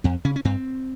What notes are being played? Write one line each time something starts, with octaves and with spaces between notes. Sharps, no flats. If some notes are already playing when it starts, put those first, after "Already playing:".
F2 C4
C#3 C#4
C#4
G2 C4